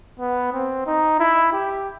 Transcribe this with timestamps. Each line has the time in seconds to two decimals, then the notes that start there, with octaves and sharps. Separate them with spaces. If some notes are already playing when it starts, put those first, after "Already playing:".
0.19 B3
0.53 C4
0.86 D#4
1.20 E4
1.53 G4